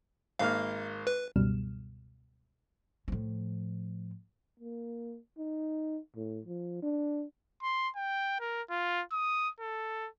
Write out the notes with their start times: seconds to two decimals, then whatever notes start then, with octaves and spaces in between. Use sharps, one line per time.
0.39 G#1 A#3 F5 F6
1.07 B4
1.36 C#2 F#2 B2 G3 F6 E7
3.08 A2 F3
4.60 A#3
5.38 D#4
6.16 A2
6.45 F3
6.83 D4
7.63 C6
7.96 G5
8.40 A#4
8.70 F4
9.12 D#6
9.60 A4